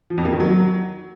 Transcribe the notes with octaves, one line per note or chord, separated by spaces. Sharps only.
F3
F2
A#3
D#3
F#3